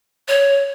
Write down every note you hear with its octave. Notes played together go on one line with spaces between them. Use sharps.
C#5